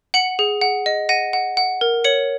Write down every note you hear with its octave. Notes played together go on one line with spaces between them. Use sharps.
F#5 C#7 F#7
G#4
F#5
D#5
F#5 A#6 D#7
F#5
F#5
A#4
C#5 C#7 F#7